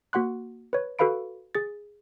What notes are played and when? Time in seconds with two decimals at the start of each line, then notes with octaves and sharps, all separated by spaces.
0.13 A#3 F#4 F#5 C6 F#6
0.73 B4 C#5
0.99 F#4 A4 B4 F5 B5 D7
1.55 G#4 A6